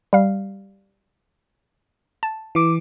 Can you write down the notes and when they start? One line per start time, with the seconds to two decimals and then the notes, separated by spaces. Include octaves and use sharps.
0.13 G3 F5
2.23 A5
2.55 E3 D6